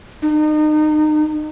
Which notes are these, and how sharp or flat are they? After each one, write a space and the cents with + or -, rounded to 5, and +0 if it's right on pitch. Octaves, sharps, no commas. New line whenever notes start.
D#4 -30